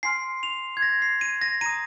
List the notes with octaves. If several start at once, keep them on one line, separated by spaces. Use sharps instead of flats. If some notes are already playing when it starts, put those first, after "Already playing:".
G#5 C6 F6 C7
F7
G#6
A#6
C7
D#7
A#6
A#5 D#6 D#7